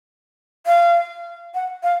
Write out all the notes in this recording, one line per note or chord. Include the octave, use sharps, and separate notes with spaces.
F5
F#5
F5